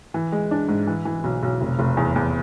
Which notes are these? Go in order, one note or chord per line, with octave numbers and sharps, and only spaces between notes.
E3
G#3
D4
G#2
E3
E3
B1
B1
F1
F1
E2
E2